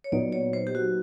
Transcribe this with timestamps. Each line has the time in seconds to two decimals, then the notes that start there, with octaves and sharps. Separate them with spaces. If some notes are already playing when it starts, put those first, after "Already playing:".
0.04 C#5
0.12 A#2 F#3 B3 D#4 D5
0.32 C#5
0.53 C5
0.67 G4
0.75 F#4